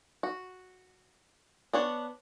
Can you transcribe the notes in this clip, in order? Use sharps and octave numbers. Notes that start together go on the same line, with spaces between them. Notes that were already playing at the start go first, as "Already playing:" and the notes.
F#4
B3 D4 C#5